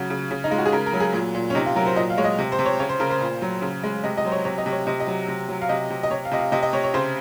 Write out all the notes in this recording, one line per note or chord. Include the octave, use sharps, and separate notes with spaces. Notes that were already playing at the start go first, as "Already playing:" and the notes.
Already playing: C#3 F#3 F#4
C#3
C#3
D#4
G#3 F4
F#4
G#4
C#3 A#4
A#4
F#3
G#4
A#2
A#2
C#4
C3 D#4
F4
F#3 A#4
C5
A#2 D#5
F5
G#3 C#5
D#5
C3
C5
C3
C#5
C#3 C#5
C5
C#3 A#4
C5
A#2
F#3
C#3
G#3
C3 D#5
D#5
F#3 C5
C#5
C3 C#5
D#5
C3
C#5
C3 D#5
D#5
F#3
C3
F#3
F5
C3 D#5
C3
D#5
C3 C#5
F5
C3 D#5
F5
C3 D#5
D#5
C3 C#5
C#5
C#3 C5